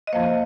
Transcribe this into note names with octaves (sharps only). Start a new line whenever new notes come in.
D#5
F2 F3 A#3 C5 F5